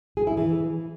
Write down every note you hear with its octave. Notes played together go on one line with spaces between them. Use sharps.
G#4
E4
E3